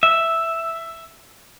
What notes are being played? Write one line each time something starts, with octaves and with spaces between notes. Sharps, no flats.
E5